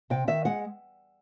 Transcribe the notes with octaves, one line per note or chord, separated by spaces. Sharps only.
C3 G5
D#3 E5
G#3 F#5